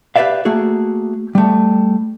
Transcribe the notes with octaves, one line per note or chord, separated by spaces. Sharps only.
G4 B4 C#5 D5 E5 F5
A3 A#3 F#4 G#4
G3 A3